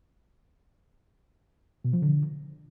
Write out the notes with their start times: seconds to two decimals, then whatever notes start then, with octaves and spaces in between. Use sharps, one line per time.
1.85 B2
1.93 F3
2.02 D3